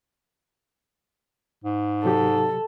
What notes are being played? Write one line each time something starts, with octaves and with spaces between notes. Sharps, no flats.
G#2
C3 F#3 G4 A4